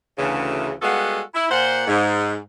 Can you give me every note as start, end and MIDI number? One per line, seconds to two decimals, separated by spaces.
0.18 0.73 38
0.18 0.73 49
0.18 0.73 52
0.82 1.21 55
0.82 1.21 56
0.82 1.21 59
0.82 1.21 66
0.82 1.21 69
0.82 1.21 77
1.34 1.45 64
1.50 1.87 46
1.50 1.87 72
1.50 1.87 78
1.87 2.38 44